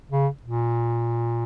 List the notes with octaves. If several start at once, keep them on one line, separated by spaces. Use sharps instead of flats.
C#3
A#2